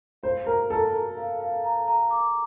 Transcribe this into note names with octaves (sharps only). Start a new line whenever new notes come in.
C5 F5
A#4 A#5
A4 A#5
A#4
F5
F5
A#5
A#5
D6